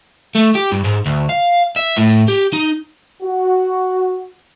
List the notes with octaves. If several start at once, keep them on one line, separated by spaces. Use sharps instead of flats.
A3
G4
G2
G#2
D2
F5
E5
A2
G4
D#4
F#4